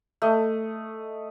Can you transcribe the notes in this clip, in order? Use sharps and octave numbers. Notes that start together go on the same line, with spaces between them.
A3 D#5